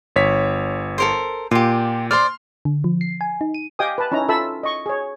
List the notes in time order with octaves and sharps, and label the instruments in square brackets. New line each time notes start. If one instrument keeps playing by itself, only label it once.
[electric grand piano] G1 C#5 B6
[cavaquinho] A4 A#4 C5
[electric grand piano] A#2 [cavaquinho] F4 G4
[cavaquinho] C5 D5 [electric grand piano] C6 F6
[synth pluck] D3
F3
C7
G#5
D#4
D#7
[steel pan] G4 D#5 F5 G5 G#5 D#6
B4 A5
C#4 D#4 E4 A#5
F4 A4 E5 A5 B5 E6
D#5 C#6
G#4 C#5